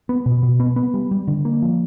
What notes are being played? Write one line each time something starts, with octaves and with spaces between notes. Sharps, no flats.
B3
B2
B2
B3
B3
G3
G3
D3
A#3
F3